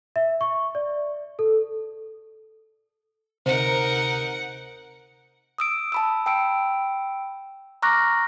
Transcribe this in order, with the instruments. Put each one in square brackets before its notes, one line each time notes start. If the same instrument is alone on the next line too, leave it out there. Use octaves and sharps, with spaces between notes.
[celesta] E5
C#6
D5
A4
[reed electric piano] D2 C3 [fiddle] D#4 A#4 [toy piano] C5 [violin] F#5
[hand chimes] D#6 E6 D7
A5 B5 E6
G5 B5 E6 D7
A#5 C#6 D6 F6 F#6 A#6